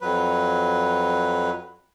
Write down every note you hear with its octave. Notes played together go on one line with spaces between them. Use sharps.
F2 F#3 B4